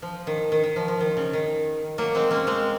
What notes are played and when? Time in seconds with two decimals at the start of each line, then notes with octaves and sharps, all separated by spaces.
0.02 F3
0.27 D#3
0.52 D#3
0.64 D#3
0.76 F3
0.88 F3
1.01 D#3
1.17 C#3
1.33 D#3
1.98 F#3 A#3
2.15 G#3 C4
2.31 A#3 C#4
2.47 G#3 C4